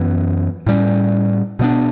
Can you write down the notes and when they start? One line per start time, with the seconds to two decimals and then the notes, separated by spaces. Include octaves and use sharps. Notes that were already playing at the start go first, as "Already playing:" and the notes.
Already playing: F#2 E3 B3
0.66 A2 G3 C#4
1.59 B2 G3 B3 D4